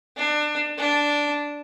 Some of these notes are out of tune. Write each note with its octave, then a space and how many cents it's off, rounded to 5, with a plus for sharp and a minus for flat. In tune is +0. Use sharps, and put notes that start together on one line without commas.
D4 +25
D4 -5